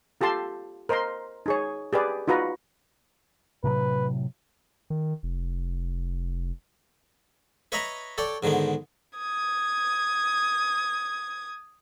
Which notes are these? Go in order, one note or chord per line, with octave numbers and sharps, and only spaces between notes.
F4 G4 A4 A5 C6
A#4 C5 D#5 A#5 C6
D#4 G#4 C#5
G4 G#4 B4 D5
D#4 F4 F#4 B4 A#5
A2 C3 F#3 B4
D#3
F1
B4 C#5 D#5 E5 A#5 B5
A4 C#5 D5 G5
G#2 D3 D#3 G#3 B3
D#6 G#6